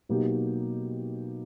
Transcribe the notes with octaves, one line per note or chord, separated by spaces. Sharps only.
B2 F#3 A#3 D#4 G4